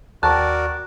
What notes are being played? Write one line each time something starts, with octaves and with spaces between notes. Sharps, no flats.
D#2 F#4 A#4 D5 G5 A5 C#6 F#6